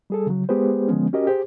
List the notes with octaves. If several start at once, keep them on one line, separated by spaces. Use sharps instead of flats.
G3 G#4 A4
C#3 F#3
G#3 B3 G4 G#4 B4 C5
D3 F3 G#3 B3 C#4
C#4 F#4 G4 A#4 D#5
G4 G#4 C5